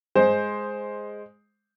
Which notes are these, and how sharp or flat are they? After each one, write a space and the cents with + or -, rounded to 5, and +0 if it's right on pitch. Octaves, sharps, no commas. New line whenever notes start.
G#3 +0 C5 +0